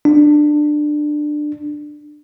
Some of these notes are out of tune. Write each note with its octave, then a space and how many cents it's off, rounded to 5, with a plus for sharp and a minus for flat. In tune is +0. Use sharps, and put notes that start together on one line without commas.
D4 +20